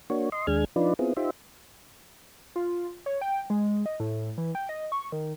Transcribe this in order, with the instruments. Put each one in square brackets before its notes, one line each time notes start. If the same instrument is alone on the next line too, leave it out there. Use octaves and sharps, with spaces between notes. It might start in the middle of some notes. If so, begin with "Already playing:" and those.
[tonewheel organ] A#3 D4 F#4 C#5
D#5 C6
D#2 G#3 D4 G#4 F6 G#6
F3 D4 D#4 F4 B4 D5
B3 C4 E4 F4 G#4
D#4 F4 G4 C5 E5
[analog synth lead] F4
C#5
G5
G#3
D#5
A2
E3
G5
D#5
C#6
D#3